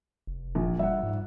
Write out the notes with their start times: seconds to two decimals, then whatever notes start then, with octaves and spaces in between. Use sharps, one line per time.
0.27 F1
0.55 A#1
0.79 G3 E5 F#5
1.03 G#2